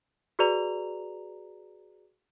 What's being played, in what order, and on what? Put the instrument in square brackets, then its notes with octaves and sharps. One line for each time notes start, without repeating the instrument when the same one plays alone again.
[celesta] F#4 G#4 B4 D5 A#5 F7